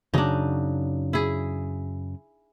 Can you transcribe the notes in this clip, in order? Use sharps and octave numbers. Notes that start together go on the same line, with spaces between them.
F#2 C#3 F#3 D4 D#4
E4 G#4